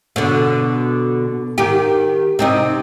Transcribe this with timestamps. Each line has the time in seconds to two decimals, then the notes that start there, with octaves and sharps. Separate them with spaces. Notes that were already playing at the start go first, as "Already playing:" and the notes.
0.16 B2 D3
1.58 D#3 G4
2.39 C3 C4 D#4